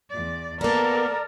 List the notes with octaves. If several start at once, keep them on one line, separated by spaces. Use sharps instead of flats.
E2 D5
A#3 B3 A4 A#4 D5